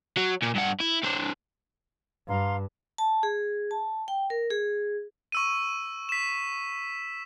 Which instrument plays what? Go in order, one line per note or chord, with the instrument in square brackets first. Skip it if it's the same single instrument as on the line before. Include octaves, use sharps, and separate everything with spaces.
[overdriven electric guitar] F#3
A#2
G2 F#5
E4
C4 D4
[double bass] G2 [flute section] F5 A#5 C6
[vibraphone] A5
G#4
A5
G5
A#4
G#4
[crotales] C#6 E6 D#7
B6 E7